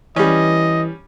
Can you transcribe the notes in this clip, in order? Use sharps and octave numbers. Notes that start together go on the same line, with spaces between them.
E3 G3 C#4 D#5